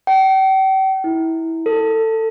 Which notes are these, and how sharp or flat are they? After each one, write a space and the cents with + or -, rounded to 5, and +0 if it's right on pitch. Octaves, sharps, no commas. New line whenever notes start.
G5 -40
E4 -15
A4 +20